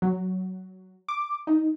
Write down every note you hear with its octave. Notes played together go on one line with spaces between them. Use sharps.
F#3
D6
D#4